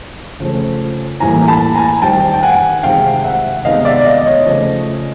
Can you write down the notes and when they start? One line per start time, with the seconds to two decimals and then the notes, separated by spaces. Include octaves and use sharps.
0.40 C#3 F3 A3 C4
1.20 A2 E3 G3 A#3 G#5 A#5
1.48 A5 B5
1.75 G#5 A#5
2.02 D#3 G3 C4 G5 A5
2.34 G5
2.43 F#5 G#5
2.83 C3 D#3 G#3 C4 F5 G5
3.24 E5 F#5
3.65 C3 D#3 G#3 B3 D#5 F5
3.85 D5 E5
4.05 D#5 F5
4.26 C#5 D#5
4.46 C#3 F3 A3 C4